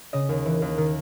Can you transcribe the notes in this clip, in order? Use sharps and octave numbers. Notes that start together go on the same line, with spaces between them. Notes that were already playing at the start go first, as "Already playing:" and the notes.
C#3 D#5
D#2
E3
D#2
D#3